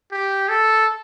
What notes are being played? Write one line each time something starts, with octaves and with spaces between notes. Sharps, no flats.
G4
A4